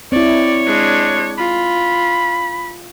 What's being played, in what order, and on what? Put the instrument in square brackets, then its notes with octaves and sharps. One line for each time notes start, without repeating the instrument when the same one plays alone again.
[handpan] C4 E4 [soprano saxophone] C#5 [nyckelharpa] D5
[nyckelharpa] G#3 D4
[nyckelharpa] F4 [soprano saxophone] B5